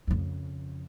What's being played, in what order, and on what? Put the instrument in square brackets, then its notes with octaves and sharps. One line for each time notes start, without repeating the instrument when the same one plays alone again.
[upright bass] F2 C#3